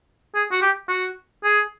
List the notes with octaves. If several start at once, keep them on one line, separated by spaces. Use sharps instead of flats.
G#4
F#4
G4
F#4
G#4